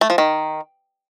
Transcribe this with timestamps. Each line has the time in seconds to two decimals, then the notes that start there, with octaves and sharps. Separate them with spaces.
0.01 A3
0.10 F3
0.18 D#3